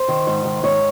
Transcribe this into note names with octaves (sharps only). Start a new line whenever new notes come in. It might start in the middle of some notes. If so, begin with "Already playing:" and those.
Already playing: C5
D#3
G#2
D#3
G#2 C#5